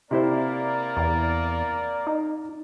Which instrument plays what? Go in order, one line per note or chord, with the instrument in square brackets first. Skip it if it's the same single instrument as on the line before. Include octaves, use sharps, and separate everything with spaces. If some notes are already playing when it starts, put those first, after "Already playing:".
[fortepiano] C3 E4 C5 [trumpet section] A#3 A#4 D5
[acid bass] E2
D#4